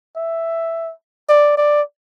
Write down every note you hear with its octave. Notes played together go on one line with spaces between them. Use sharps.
E5
D5
D5